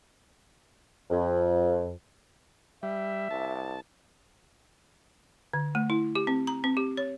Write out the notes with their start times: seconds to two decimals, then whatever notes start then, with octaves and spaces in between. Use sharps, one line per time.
1.10 F2
2.83 G3 E5
3.31 C2 A5
5.54 D3
5.75 A3
5.90 E4
6.15 G4
6.27 C4
6.47 A#5
6.64 C4
6.77 G4
6.97 C#5